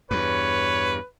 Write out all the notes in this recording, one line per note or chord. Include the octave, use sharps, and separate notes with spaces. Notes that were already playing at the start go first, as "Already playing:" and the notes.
E2 G2 B4 C#5